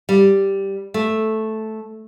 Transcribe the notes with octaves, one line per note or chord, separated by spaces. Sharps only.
G3
A3